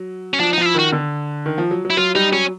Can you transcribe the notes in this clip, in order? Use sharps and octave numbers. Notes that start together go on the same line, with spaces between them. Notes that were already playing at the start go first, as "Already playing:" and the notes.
Already playing: F#3
C#4
F3 D4
D#4
F3 F4
E4
D#3 F#4
D3
D#3
F3
F#3
F#3
E4
F#3 F4
G3 D#4
F#3 C#4